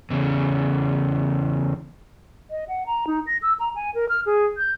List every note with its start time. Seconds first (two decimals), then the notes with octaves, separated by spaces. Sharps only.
0.10 E2 C#3
2.51 D#5
2.68 F#5
2.87 A#5
3.07 D#4
3.27 A#6
3.42 E6
3.60 A#5
3.76 G#5
3.95 A#4
4.09 F6
4.26 G#4
4.58 G6